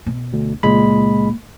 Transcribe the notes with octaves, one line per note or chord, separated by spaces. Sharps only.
B2
D2
C#2 A#2 G#3 B5